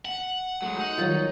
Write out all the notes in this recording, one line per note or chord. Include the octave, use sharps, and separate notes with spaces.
F#5
F#3 G#3 A3
D#4
D#3 F#3 G3 F4 C#5